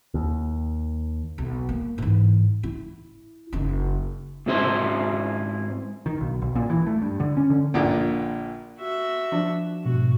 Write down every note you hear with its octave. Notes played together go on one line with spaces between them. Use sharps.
D#2
B1
A#3
G#2 E3
E4
F#1 D#4
G#2 C4 E4 C5
D#3
B1
B1
A#2
E3
A3
G2
D3
C#4
D3
A#1 A#2 D3
F#4 E5
F3 D4
G#2 B2 F#4